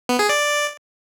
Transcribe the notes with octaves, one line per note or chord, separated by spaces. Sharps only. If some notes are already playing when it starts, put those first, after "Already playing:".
B3
G#4
D5